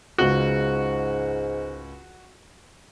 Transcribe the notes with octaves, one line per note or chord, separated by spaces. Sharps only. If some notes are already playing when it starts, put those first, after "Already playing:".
C#2 G#2 F#4 F#7 G7